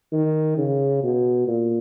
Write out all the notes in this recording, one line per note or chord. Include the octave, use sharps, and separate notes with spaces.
D#3
C#3
B2
A#2